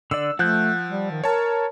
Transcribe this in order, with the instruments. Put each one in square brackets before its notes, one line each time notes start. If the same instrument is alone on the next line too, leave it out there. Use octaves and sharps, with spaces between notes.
[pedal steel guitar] D3 D5 [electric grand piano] E6
[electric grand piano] F3 [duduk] A3 [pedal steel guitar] F#5 F#6 G6
[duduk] G3
D#3
[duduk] A#4 [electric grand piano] C#5 A5